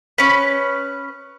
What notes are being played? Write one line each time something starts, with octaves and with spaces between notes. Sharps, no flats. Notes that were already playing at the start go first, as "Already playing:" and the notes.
C#4 B4